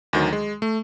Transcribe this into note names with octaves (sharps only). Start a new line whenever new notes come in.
D2 D#3 F#3
G#3
A3